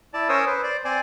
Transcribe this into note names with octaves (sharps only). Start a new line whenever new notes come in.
E4 D5 A5
C#4 A#4 C5 C#5 D#6 E6
B4 C5
C5 D5
C4 C5 D5 G#5